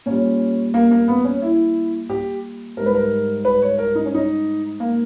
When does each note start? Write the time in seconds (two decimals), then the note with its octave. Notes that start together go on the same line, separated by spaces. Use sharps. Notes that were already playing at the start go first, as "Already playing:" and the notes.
0.06 A#2 G3 C#4
0.74 A#3
0.91 A#3
1.08 B3
1.24 C#4
1.42 E4
2.10 G4
2.77 G#2 G3 A#4
2.86 B4
2.95 A#4
3.45 B4
3.62 C#5
3.78 A#4
3.95 D#4
4.05 C#4
4.14 D#4
4.80 A#3